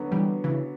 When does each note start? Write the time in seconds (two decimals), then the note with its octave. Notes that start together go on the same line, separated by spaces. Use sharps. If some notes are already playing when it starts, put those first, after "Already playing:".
Already playing: D3 F#3 B3 F#4
0.12 E3 G3
0.44 C#3 E3